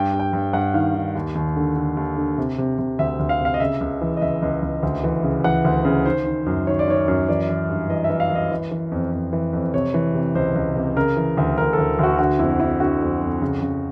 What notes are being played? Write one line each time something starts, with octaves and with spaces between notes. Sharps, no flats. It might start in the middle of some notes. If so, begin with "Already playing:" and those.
Already playing: G2 G5
G2
G5
G2
G2 F#5
D#3 F5
D#3
D#2
D#2
D3
D3
D#2
D3
C3
C3
C3
D2 E5
D2
F5
C3 F5
D#5
C#3 E5
C#2
E3
D#5
C#2 E5
C#2
C#2
D2
E3
C#3
E3 F#5
D2
C#3
D#3 C5
D#3
F#2
D#3 C#5
D5
D#3 C#5
F#2
E3 D5
E3
G2
E3 D#5
E5
E3
F5
E3
D#5
E3
E3
F2
F2
E3
F2
C3 C#5
E3
C3
C#2 C5
C#2
C3
C#3 A#4
E3
D2
D2 A#4
A4
D2
D2 F#4
D3 F#4
F2 E4
F2 E4
D3 F#4
F2
F2
C#3
C#3